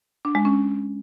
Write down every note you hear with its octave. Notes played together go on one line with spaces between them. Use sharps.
D4
G#3
C#4